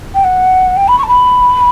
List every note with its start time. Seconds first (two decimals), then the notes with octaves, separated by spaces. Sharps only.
0.14 G5
0.24 F#5
0.77 G5
0.88 B5
0.98 C#6
1.03 A5
1.08 B5